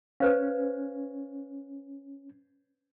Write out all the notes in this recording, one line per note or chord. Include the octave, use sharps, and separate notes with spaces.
C#4 B4 C5 F5